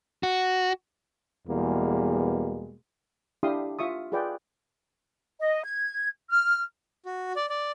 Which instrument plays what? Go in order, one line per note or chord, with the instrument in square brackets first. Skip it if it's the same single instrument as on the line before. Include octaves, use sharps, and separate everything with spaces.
[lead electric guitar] F#4
[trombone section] E2 B2 G3 G#3 A#3
[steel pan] D4 E4 G4 F5 C6 D#6
F4 E5 C#6 D#6
F4 G#4 B4 D5 G5
[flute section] D#5
G#6
F6
[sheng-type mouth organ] F#4
D5
D5